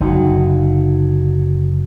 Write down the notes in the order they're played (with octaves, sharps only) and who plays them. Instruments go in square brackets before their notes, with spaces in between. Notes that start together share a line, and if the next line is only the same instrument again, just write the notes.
[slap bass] F#1 D3 [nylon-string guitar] F#3 D#4